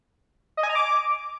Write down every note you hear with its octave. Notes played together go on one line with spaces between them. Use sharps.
D#5
G#5
A#5
D6